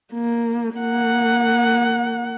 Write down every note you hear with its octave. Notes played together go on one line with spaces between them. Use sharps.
A#3
A#3 F#5